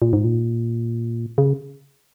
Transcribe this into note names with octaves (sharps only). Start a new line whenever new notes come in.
A#2
G#2
A#2
C#3